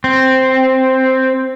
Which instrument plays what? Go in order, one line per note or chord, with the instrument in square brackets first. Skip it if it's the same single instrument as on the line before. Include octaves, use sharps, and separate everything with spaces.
[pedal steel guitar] C4